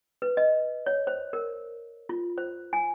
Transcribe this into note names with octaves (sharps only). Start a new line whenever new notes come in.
B4
D#5
C#5
C5
A#4
F4
C5
G#5